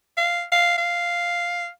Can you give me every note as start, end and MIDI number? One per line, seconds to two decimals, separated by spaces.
0.17 0.44 77
0.52 0.76 77
0.78 1.69 77